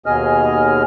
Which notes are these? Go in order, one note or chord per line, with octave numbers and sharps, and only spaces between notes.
D#2 B2 G#4 D#5 F6